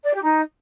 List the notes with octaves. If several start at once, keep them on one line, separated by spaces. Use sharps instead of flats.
D5
G4
D#4